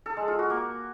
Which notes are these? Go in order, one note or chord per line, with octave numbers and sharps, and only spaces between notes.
A4
G#3
F4
F#4
A#3